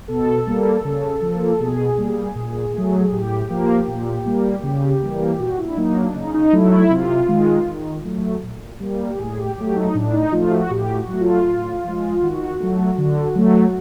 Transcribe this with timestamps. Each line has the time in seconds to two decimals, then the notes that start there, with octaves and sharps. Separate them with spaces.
0.08 B2 A4
0.47 G3 A#3
0.84 C#3
1.21 F3 A#3
1.60 B2 G#4
1.98 G3 A#3
2.35 A#2
2.74 F#3 A3
3.12 A2 G4
3.50 F3 A#3
3.88 A#2
4.26 G3 A#3
4.63 C#3
5.02 E3 G3 A#3
5.39 A#2 F#4
5.58 E4
5.69 D4
5.77 F#3 A#3 D#4
5.96 D4
6.15 C#3 D#4
6.34 D#4
6.53 F#3 A3 E4
6.72 E4
6.90 C3 F4
7.28 D#3 G#3
7.67 D#3
8.05 F#3 A3
8.43 A#2
8.80 G3 A#3
9.10 G4
9.18 A2 G#4
9.38 G4
9.56 F#3 A3 G4
9.75 D#4
9.94 A2 D4
10.13 D#4
10.32 F3 A3 F4
10.51 F#4
10.71 A2 G4
10.95 F#4
11.08 F#3 A3
11.21 F4
11.46 A2
11.84 F3 G#3
12.22 D#3 F#4
12.60 F#3 A3
12.98 D3
13.35 F#3 A3